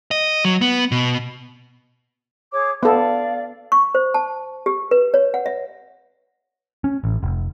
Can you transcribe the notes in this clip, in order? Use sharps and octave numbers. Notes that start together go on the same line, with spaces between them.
D#5
F#3
B3
B2
G#4 C#5 D6
B3 A4 D5 F5
C#6
C5
A5
G4
B4
C#5
F#5
E5
C#4
A1
F1